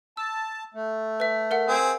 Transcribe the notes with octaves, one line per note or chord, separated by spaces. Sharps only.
A5 E6
A3
B4 E5
A#4 E5 F#5
C4 G#4